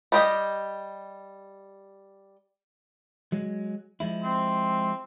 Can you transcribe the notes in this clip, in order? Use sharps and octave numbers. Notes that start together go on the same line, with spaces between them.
G3 G4 D#5
F#3 G#3
F3 G#3 E4
C4